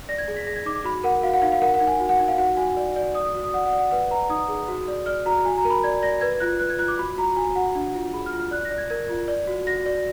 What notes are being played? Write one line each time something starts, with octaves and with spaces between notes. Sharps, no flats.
D5 A#6
G#6
G#4 A#6
B6
G#4 A#6
G#6
D#4 D6
D6
F#4 B5
A#4 F#5
F#4 F5
F#5
D#4 F5
F5
A#4 F#5
F#5
D#4
G#5
F#4
F#5
D#4
F5
F#4 F#5
F#4 G#5
D5
D5
D5 D#6
D#6
F#4
D#6
D5 F#5
F#5
D5
F#5
B4 F#5
B4 A#5
D#4 D#6
G#4
F#4
D5
D5 F6
F#4 A#5
F#4 G#5
A#5
A#4
B5
D5 G#6
D5 A#6
B4 G#6
F4 F#6
B4 F#6
G#6
F4 F#6
D6
F#4 B5
F#4 A#5
F#4 G#5
F#4 F#5
D4
F4
G#4 B5
F6
F4
F6
D5 F#6
A#6
D5
G#6
A#4 G#6
F4
D5
F#4
F#4 A#6
D5